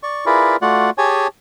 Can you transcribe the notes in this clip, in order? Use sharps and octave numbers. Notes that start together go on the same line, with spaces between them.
D5 C#6
E4 F4 G#4 A#4 B4 D5
A3 F4 F#4 D5 F#5
G4 G#4 C#5 G#5 A5